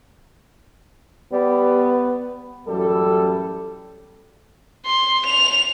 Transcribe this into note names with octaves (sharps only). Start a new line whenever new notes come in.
G3 B3
A1 F#2 G3 E4 A4
C6
F7